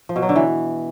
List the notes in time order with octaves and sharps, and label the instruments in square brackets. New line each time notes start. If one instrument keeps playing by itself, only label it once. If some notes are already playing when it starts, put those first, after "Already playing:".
[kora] F3
B2
F#3
D3
E3